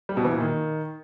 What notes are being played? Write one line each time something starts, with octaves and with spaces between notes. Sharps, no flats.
G3
B2
E3
A#2
D#3